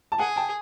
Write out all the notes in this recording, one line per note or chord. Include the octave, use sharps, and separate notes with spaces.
A5
G#4 F#5 G#5
G5 A5